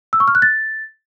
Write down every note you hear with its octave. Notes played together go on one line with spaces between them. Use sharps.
E6
C#6
F6
F#6
A6